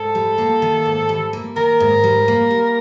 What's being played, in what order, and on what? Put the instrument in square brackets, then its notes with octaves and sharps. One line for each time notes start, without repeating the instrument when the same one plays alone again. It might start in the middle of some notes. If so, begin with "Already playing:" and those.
Already playing: [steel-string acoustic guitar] G#2 [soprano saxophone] A4
[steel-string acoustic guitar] G3
A#3
D#3
G#2
G3
A#3
[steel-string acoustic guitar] D#3 [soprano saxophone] A#4
[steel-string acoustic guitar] G#2
G3
A#3
G3